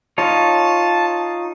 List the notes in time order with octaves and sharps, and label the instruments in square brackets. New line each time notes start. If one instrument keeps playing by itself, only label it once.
[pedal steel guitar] D#4 F4 C#5 [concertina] A5